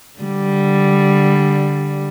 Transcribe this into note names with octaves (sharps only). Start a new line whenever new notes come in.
D3 G3